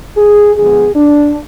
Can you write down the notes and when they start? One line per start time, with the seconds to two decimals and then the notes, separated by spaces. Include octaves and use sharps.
0.18 G#4
0.56 D3 F3 G#3 B3 G#4
0.96 D4